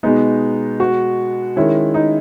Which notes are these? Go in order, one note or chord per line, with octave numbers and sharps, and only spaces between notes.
B2 G#3 B3 D#4
F#4
D#3 G#3 C#4 E4
D#4